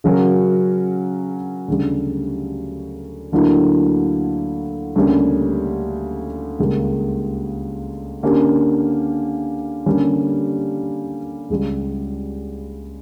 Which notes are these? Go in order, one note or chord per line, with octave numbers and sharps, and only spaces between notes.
C#3 F#3 C#4 F#4 A#4
D2 C#3 G3
D2 D3 F#3 A#3 E4
D2 C#3 G3 A#3 C#4
C#2 C#3 G3 A#3
D3 A#3 C#4 G4
D3 G3 A#3 C#4
C#2 C#3 G3